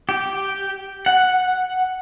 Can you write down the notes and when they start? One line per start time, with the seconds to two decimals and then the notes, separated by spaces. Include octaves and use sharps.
0.09 G4
1.06 F#5